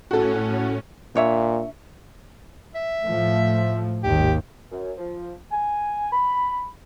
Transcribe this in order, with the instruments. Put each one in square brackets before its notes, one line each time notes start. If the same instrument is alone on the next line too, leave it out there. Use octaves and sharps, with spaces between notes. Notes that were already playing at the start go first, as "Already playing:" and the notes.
[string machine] A2 C#4 [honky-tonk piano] F#4 A4
[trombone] A#2 [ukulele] D4 C#5 E5
[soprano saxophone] E5
[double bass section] A2 F3 A3
[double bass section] G#1 D#2 [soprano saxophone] G4
[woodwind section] F#2
F3
G#5
B5